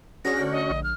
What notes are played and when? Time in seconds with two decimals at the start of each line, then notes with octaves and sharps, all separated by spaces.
0.25 C#4 D4 F#4 G#4 B4 A#6
0.37 D2 D3 G5
0.51 D#5
0.70 A#1
0.84 F6